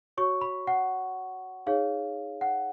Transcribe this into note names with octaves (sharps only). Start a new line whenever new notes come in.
F#4 C#5 C#6
B5
F#5
D#4 G#4 C#5 F5
F#5